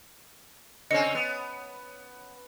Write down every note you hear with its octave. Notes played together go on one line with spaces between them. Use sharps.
C#3 C4 C#4 D#5 C#7
B3